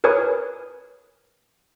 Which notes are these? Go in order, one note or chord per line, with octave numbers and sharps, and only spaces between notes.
A#4 B4 C#5 G#5 D#6